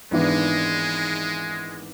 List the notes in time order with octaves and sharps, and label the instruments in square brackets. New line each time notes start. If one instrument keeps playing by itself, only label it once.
[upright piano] G#1 G#2 E3 B3 D4 [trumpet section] G#3